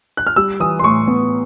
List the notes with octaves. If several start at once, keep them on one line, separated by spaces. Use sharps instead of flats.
F#6
F6
G3 E6
E3 D#6
C6
A2 C#6
B3